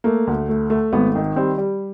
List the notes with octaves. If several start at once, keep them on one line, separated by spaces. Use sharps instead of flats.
A3 A#3
D2
A3
A3
G#1 B3
D#3
G3 C4
G3